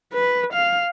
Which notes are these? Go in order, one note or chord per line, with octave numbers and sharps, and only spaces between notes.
B4
F5